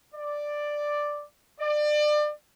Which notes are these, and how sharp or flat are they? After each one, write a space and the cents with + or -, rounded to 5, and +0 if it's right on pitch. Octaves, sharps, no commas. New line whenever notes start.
D5 +5
D5 +30